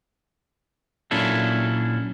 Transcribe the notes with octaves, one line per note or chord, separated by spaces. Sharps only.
A#2 F#3 C#4 D4 E4 A4